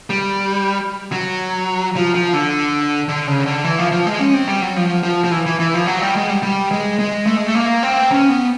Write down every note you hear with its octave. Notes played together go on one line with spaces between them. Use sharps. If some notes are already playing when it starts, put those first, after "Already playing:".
G3
F#3
F3
F3
D3
D3
C#3
D3
E3
F3
F3
G#3
C#4
C4
G3
F#3
F3
F3
F3
E3
E3
E3
F3
F#3
G3
G#3
G3
G3
G#3
G#3
A3
G#3
A3
A#3
C4
C#4
B3